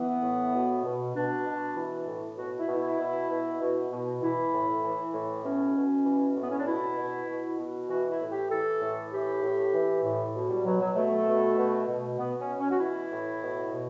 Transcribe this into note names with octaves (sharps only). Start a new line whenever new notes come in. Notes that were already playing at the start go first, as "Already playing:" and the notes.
Already playing: E3 B3
A2
B2
B2
B2 D4
B2
E3
A2
B2 F#4
E4
B2
E4
B2
B2
B2
B2
E3 E4
A2
E3
A2
B2 C#4
B2
E3
A2
B3
C#4
D4
B2 E4
B2
B2
B2
E3 F#4
E4
A2
G4
E3 A4
A2
E3 G4
A2
E3
A2
B2
G3
B2 F#3
F#3
B2 A3
B2
B2
B2
B2 B3
C#4
B2
C#4
F#4
E3 E4
A2
B2
B2